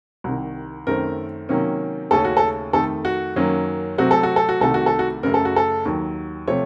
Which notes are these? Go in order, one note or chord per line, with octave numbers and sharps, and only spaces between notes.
C2 C3 D#3
F#2 D#3 A3 C4 A#4
C3 D#3 F#3 A#3 C#4
D#2 C#3 A3 C#4 A4
F#4
A4
F2 D#3 A3 A4
F#4
F#2 D#3 F#3 A#3 C#4
C3 F#3 A3 C4 F#4
A4
F#4
A4
F#4
C2 C3 D#3 A3 A4
F#4
A4
F#4
F#2 C#3 A3 A#4
A4
F#4
A4
D#2 D#3 F#3
C3 F3 A3 C#5